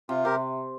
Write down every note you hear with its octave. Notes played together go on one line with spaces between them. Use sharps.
C3 F4
C3 G4 A#4